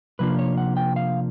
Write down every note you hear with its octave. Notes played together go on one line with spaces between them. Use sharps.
C3 F3 A#3 D4 F4 B4
C#5
F#5
G5
F5